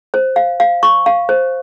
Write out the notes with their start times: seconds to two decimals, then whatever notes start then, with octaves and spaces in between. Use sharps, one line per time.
0.14 C5
0.36 F5
0.60 F5
0.83 C#6
1.06 F5
1.29 C5